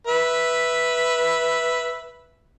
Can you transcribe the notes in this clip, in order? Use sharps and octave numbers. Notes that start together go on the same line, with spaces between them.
B4 E5